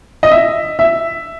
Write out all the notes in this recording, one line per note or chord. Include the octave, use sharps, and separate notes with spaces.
D#5
E5
E5